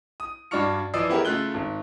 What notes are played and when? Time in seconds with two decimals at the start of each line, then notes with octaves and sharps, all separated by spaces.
0.20 D#6
0.51 G2 D4 F#4 C#6 F6 C#7
0.94 E3 F3 D5 D#6 E6 C7
1.09 B3 E4 G4 G#4 A#4
1.25 C#3 A3 F4 F#6 G7
1.54 G#1